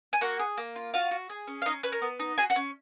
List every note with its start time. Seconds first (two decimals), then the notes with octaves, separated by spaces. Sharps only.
0.13 G#5
0.21 A#3 F#4 F#5
0.39 G#4
0.57 A#3
0.76 F4
0.94 F4 F#4 F5
1.11 F#4
1.30 G#4
1.47 C#4
1.62 F5
1.66 C#4 D#4 D#5
1.83 C#4 B4
1.93 A#4
2.02 B3
2.20 D#4
2.38 F#4 G#4 G#5
2.50 F#4 F#5
2.56 C#4